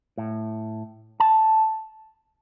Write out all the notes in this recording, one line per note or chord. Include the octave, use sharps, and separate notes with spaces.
A2
A5